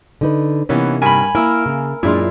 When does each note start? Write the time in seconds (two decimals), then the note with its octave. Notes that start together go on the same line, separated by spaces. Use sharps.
0.21 D3 D#4 B4
0.69 C3 E3 A#3 B3 C#4 D#4
1.02 G2 A#4 G#5 B5
1.35 A#3 E4 A#4 E6 F6
1.66 C#3
2.03 F#2 A#2 G#3 D4 E4 F4